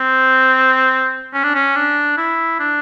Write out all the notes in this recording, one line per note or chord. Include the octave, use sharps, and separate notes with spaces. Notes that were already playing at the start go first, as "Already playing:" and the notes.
Already playing: C4
C#4
D4
C#4
D4
E4
D4